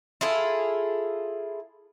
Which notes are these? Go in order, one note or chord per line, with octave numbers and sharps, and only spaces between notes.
E4 F4 G#4 A4